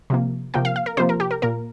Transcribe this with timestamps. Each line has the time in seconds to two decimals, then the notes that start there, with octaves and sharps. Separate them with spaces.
0.10 C3 F3 A#3
0.54 C3 F3 A#3 G5
0.65 F5
0.76 F5
0.86 A#4
0.97 C3 F3 A#3 C5
1.09 A#4
1.20 G4
1.31 A#4
1.42 A#2 A#3 A#4